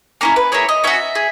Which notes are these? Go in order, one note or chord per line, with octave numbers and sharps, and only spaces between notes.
A#3 C#4 E4 A#4
B4
A#3 E4 G#4 C#5
D#5
C#4 F#4 E5
G#4